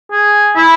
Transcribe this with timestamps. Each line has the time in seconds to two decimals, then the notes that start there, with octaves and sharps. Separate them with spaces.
0.11 G#4
0.56 E4